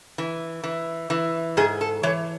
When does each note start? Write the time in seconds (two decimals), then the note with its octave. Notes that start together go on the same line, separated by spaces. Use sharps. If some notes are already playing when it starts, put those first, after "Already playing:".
0.18 E3
0.64 E3
1.10 E3
1.57 G#2 G#4
1.81 A4
2.03 E3 C#5